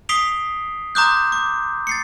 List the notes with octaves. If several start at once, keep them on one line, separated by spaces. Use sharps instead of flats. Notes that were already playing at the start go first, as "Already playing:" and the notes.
D#6 B6 C7 D7 F7 G7
A#5 C6 D6 D#6 F#6 G6
D6
A6 C7 C#7